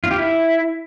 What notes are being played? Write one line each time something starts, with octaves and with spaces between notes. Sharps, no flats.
F4
G4
E4